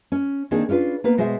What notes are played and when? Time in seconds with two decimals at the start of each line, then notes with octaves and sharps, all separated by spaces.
0.12 C#4
0.51 D#3 A#3 C4 D4 G#4
0.69 C#4 D4 F4 B4
1.04 A#3 B3 B4
1.18 B2 G#3 C5 C#5 E5